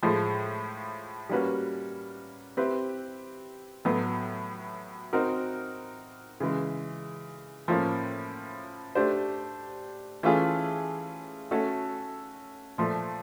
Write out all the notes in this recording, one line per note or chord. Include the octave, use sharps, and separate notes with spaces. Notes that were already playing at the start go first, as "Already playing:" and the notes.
A2 F3 G#3
G3 A#3 C#4 F#4 B4
C4 E4 G4 B4
A2 F#3 B3
C4 D#4 F#4 A#4
C#3 E3 G#3
A2 F3 A#3 C#4
A3 D4 G4 C5
E3 A3 C#4 F4 G#4
A3 C#4 F#4 A4
A#2 F3 A3